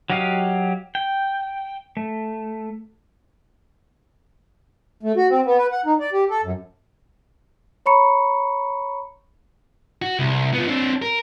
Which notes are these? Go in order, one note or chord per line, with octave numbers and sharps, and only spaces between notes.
F#3 F#4 G4 D#5 F5
G5
A3
A3
F#4
C4
B3
B4
F#5
D#4
D5
G4
A4
F#2
C#5 A#5 B5 C#6 C#7
F#4
C2
B3 F4
C4 D4
A#4